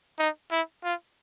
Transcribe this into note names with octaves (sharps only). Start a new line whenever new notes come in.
D#4
E4
F4